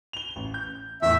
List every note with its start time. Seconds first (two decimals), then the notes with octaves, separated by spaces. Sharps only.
0.13 F7 G7
0.36 A1
0.54 G6
1.02 E2 A2 E5